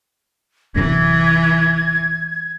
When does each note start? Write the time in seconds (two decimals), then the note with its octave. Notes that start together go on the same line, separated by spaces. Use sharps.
0.75 D1 F#2 C3 E3 G#6